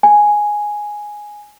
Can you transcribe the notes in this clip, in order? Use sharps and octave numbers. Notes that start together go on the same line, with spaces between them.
G#5